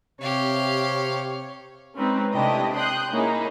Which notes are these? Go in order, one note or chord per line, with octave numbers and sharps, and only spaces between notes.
C3 G4 C#5 F5
G#3 C4 C#4 D#4 B4
C3 A3 D4 E4 G4 D#5
G5 C6 D#6 F#6 G6
A#3 C#4 D#4 E4 G#4